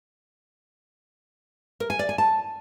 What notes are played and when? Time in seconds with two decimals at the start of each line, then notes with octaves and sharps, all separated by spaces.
1.80 A#4
1.90 G#5
1.99 D5
2.09 G#5
2.18 A5